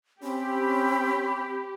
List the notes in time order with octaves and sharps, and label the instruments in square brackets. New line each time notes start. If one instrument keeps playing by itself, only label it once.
[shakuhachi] C4 [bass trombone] C#4 [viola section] G4 [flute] B5